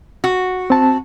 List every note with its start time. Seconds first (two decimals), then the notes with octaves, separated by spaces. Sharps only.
0.24 F#4
0.70 C4 A5